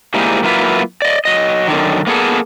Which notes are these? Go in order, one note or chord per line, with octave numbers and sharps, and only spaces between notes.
G#2 G3 A#3 E4 G4 G#4
F#3 A#3 E4 F4 B4
D5 D#5
F#3 D#5
F#2 D3 D#3
A#3 B3 G#4 A4